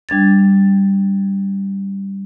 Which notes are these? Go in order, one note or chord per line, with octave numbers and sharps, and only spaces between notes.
G3 D4 G#6 A6